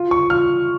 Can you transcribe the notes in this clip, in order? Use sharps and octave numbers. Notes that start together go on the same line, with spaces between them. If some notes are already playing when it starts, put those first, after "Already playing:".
Already playing: F4
C#6
F4 F6